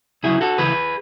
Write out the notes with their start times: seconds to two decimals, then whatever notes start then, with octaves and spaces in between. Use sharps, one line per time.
0.23 D2 C#3 F#3 C#4 E4 G#4
0.41 F#4 A4
0.58 D2 C#3 E3 G#4 B4